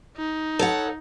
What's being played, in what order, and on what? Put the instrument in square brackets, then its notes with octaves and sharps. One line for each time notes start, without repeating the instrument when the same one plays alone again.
[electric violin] D#4
[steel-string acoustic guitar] A4 C#5 F#5